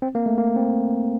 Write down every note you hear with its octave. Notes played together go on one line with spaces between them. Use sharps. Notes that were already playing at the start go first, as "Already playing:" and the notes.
C4
A#3
A3
A#3
C4